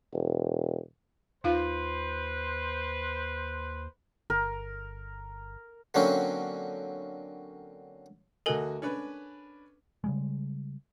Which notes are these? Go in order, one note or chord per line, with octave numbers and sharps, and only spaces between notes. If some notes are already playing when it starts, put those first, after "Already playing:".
E1
D#2 D#4 F4 B4 C5 F5
G1 A#4
D3 F#3 A#3 C4 C#4
D2 F#4 A4 A#4 D#5 G#5
C#4 D4 B4
C#3 G3 G#3